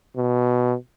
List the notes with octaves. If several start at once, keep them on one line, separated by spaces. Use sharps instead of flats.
B2